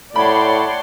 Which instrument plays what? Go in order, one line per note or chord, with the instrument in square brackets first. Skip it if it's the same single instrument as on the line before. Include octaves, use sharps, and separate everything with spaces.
[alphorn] A2 [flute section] C#5 F#5 A5 [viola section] D5 G5 C6 [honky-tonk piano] B5